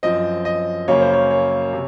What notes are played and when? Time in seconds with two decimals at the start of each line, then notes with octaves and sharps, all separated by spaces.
0.03 F#2 F3 C4 D#5
0.45 D#5
0.88 F#2 C#3 F#3 A#3 C#4 C#5
1.01 C5
1.13 C#5
1.31 C#5
1.73 C3